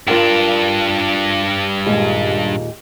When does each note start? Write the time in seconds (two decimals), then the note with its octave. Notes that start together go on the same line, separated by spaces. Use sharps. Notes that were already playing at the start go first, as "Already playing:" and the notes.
0.08 G2 D4 F4 A#4 G5
1.87 D#2 A#2 G#3